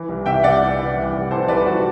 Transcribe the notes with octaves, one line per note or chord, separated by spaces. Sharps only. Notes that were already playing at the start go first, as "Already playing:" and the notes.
Already playing: E3
C2
C3 E5 G5
C2 D5 F#5
E3
E3
C2
C2
E3 A4 C5
C2 B4 D5
C2 F#4